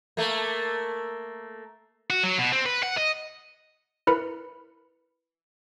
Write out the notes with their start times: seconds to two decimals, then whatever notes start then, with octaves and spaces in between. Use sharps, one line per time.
0.17 A3 A#3
2.10 F#4
2.23 F#3
2.39 B2
2.52 C4
2.66 B4
2.83 F#5
2.97 D#5
4.07 E4 A#4 B4 B5 C#7